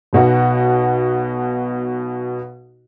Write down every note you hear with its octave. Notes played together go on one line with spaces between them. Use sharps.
B1 B2 F#4